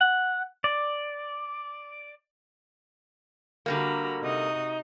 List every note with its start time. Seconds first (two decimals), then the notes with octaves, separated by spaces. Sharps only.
0.01 F#5
0.64 D5
3.66 D3 G3 A#3 F#4 A#5 B5
4.20 C3 D#4 F#4 D#6